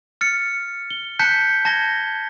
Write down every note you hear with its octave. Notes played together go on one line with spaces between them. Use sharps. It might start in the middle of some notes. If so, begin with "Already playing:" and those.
F6 A6 C#7
G7
A5 F#6 G6 B6 C#7
A5 G#6 A#6 G7